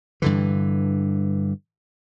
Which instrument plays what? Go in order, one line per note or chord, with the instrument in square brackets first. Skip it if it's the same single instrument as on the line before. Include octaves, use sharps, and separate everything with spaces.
[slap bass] G2 D3 E3